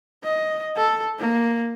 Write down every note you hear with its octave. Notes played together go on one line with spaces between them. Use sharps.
D#5
A4
A#3